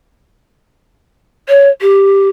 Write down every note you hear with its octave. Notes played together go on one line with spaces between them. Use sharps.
C#5
G4